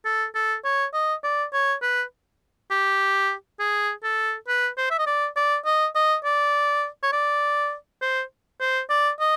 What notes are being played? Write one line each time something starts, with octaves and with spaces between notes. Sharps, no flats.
A4
A4
C#5
D#5
D5
C#5
B4
G4
G#4
A4
B4
C5
E5
D#5
D5
D5
D#5
D#5
D5
C#5
D5
C5
C5
D5
D#5